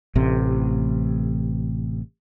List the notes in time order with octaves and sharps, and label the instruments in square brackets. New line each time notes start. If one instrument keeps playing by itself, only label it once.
[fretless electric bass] A1 C3